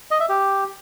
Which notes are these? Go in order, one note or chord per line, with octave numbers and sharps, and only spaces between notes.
D#5
E5
G4